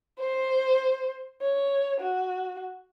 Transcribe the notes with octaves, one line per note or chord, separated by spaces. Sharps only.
C5
C#5
F#4